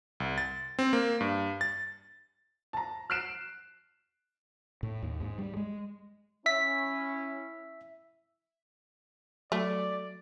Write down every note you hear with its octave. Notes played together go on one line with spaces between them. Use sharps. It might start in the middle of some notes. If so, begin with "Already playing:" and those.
C2
A6
C4
A#3
G2
A6
A5 A#5
F6 F#6 C7 D7 E7
A2
D#2
G#2
G3
G#3
C#4 E4 E5 B6
F#3 A3 D5